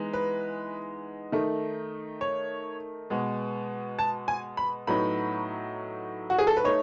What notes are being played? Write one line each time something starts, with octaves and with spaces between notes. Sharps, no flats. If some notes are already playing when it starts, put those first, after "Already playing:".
Already playing: E3 G#3 B3 D#4
B4
D#3 A3 D#4
C#5
B2 G#3 B3
A5
G#5
B5
A2 F#3 B3 D#4 B5
F#4
G#4
A4
B4
A3 D#4 C#5